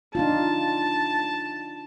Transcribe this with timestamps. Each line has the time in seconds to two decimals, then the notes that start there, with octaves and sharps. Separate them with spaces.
0.15 D4 D#4 F4 A5